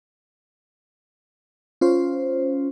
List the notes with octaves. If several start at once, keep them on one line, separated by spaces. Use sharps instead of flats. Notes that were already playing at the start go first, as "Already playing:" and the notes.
C#4 F4 C5